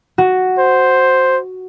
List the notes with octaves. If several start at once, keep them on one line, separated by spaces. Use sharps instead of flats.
F#4
C5